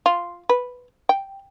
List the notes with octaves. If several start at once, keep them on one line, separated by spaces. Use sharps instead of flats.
F4
B4
G5